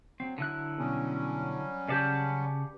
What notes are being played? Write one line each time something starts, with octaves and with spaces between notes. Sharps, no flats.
F#3 C4
D3 E4 F#6
B2 F#3 G3 C#4
C#3 G4 B4 D5 F#5 A5